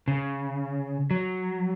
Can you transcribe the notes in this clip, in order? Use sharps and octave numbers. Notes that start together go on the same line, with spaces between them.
C#3
F#3